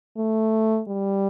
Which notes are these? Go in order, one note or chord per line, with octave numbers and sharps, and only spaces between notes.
A3
G3